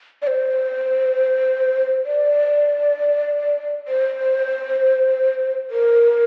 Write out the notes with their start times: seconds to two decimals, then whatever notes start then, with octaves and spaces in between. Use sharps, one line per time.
0.22 D5
0.27 C5
2.05 D5
3.88 C5
5.70 A#4